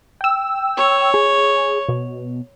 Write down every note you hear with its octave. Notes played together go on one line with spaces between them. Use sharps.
G5 E6
C#5
G#4
B2